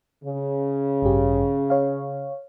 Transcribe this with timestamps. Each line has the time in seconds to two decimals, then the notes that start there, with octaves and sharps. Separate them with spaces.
0.24 C#3
1.02 A1 G2 G4
1.70 C#5 F5